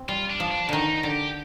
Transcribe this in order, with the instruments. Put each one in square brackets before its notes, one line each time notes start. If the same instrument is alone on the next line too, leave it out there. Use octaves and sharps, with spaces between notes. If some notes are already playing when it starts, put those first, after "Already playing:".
Already playing: [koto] C4
[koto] G3 [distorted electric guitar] F4
[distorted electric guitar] D4
[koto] F3
[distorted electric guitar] D4
[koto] D3 D#3 [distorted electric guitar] D#4
[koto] D3 [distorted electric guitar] G4